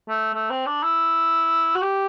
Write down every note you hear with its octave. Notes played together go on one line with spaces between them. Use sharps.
A3
A3
C4
D4
E4
F#4
G4